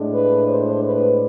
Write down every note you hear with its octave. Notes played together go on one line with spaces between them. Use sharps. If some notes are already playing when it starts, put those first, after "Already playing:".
Already playing: A2 G#3 D4
B4
C5
B4